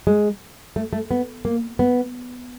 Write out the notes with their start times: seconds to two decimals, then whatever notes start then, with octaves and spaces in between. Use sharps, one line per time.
0.07 G#3
0.76 A3
0.93 A3
1.11 B3
1.45 A#3
1.79 B3